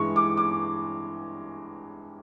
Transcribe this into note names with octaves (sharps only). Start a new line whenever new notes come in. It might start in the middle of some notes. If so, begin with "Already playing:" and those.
Already playing: G2 E3 G#3 C#6
D6
D6